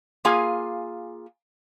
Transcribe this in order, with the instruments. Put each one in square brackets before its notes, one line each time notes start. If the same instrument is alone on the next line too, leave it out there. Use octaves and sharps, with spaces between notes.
[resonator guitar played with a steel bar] A#3 F4 G#4 F5 G#5